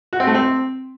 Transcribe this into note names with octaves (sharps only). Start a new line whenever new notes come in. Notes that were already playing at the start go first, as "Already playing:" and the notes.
F#4
C4
A3
C4